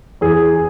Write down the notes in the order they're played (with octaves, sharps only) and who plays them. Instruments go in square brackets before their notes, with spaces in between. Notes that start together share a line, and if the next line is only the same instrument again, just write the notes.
[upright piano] E2 G#4